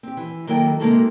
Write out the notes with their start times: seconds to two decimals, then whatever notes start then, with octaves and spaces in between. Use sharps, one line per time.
0.03 C4 G4
0.17 E3
0.47 D#3 F#3 A#3 E4 A4 G5
0.80 C3 G#3 A#3 D#4 F#4 A4